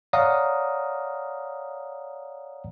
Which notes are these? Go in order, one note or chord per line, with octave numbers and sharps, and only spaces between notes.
C#5 D5 F5 F#5 A#5 D#6